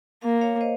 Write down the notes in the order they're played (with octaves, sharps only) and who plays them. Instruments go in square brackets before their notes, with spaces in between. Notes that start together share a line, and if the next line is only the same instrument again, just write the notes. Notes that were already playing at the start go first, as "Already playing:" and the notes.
[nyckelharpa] A#3 [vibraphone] F5
[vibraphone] C#5 F5
C5 D#5